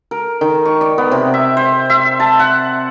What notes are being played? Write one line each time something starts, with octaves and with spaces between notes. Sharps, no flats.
A#4
D#3
C#6
D5
B3
C3
E5
C5
E5
A5
F#5